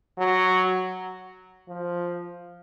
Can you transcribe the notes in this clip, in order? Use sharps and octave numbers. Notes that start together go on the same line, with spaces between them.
F#3
F3